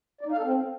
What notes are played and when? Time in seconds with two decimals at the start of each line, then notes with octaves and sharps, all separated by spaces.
0.21 D5
0.26 D#4
0.32 F5
0.37 A4
0.43 C4